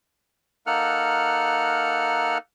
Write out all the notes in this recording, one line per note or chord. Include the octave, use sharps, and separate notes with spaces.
A#3 D#4 A4 F#5 F6 F#6